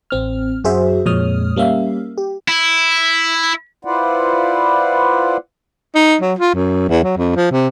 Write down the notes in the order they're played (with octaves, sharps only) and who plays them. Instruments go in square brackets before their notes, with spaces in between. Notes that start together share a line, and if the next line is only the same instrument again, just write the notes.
[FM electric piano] A1 C4 F6
F#2 F#4 G#4 C5 E5
F2 A#2 G#3 C#5 D#6 F6
G3 A#3 C#4 E5 F5
G4
[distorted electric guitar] E4
[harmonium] E4 F4 B4 C5 D5 F#5
[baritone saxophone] D#4
F#3
F4
F#2
E2
F#3
F2
F3
C3